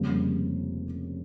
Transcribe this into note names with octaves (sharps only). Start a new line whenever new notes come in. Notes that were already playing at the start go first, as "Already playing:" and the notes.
Already playing: F1 F2 C#3 G3 A#3